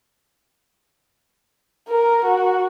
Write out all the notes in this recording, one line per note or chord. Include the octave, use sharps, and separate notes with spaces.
A#4
F#4